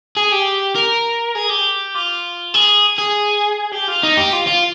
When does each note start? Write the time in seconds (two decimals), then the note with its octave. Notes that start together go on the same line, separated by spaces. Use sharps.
0.17 G#4
0.32 G4
0.75 A#4
1.36 G#4
1.50 G4
1.95 F4
2.55 G#4
2.99 G#4
3.72 G4
3.88 F4
4.03 D#4
4.17 G4
4.33 F4
4.47 F4